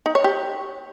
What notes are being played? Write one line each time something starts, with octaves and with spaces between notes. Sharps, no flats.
D#4
C#5
G4